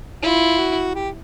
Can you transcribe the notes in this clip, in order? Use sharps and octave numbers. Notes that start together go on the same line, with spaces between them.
E4 F4
F#4
G4